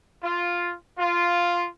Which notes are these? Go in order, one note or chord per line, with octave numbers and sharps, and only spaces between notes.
F4
F4